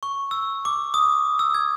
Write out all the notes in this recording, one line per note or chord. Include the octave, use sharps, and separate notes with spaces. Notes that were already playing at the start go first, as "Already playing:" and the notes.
C#6
E6
D6
D#6
E6
G#6